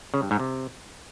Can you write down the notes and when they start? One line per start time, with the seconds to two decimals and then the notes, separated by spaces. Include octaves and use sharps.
0.14 C#3
0.22 G2
0.31 G#2
0.40 C3